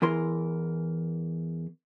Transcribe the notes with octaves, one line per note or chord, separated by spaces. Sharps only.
E2 E3 A#4 C6